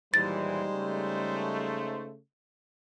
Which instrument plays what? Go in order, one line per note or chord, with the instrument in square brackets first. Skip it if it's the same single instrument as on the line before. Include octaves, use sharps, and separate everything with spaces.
[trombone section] D#2 A#2 E3 [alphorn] G3 [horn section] G#3 D#4 C5 [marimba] A6
[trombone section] C#3 A3